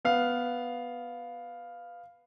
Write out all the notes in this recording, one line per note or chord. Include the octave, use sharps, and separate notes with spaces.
B3 F5